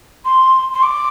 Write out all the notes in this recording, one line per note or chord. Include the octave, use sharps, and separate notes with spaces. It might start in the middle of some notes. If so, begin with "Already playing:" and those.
C6
C6
D6